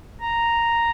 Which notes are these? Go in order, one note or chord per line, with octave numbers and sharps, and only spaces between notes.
A#5